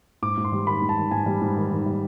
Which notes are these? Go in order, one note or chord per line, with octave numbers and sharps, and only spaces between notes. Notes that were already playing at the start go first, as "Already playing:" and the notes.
G#2 D6
G#2
C6
G3
D#3 B5
G#2
A5
D#3
G#2 G#5
G3
G#2
D#3
D#3
G3